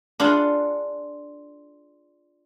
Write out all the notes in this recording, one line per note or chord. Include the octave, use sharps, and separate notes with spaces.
D4 F4 G#4 F#5